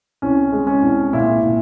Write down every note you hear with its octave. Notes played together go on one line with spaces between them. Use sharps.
C2 C#4
G#3
C#4
C2
A#2 E4
A#2